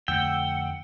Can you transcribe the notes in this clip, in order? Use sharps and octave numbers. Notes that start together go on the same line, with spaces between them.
F2 D3 A3 F#5 G5 E6